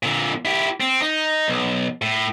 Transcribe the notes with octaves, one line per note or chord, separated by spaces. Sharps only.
A#2 D3
E4 G4
C4
D#4
B1
A2